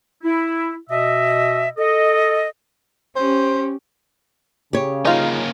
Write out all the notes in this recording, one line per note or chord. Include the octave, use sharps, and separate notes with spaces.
E4
B2 D#5 E5
A4 D#5
C#4 G4 C5
C#3 G4 C#5
A#3 C#4 D#4 F4